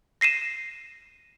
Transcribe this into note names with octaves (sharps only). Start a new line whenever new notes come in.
A#6 C7 D#7 E7